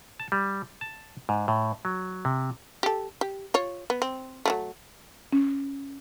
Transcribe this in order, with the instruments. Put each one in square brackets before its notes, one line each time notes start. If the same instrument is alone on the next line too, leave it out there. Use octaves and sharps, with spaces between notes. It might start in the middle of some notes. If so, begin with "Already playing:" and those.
[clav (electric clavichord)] A5
G3
A5
G#2
A2
F#3
C3
[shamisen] G4 A4
G4
F4 C#5
B3
C4
F#3 G#3 A3
[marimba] C#4